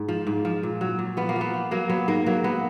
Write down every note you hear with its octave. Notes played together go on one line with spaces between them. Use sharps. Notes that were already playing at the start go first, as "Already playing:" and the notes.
Already playing: G#2
F3
G#2
F3
A#2
F#3
A#2
F3 B3
A#3
F3
B3
F3
F#3 A#3
F#3 B3
G#2 A#3
F#3 A#3
F#3 B3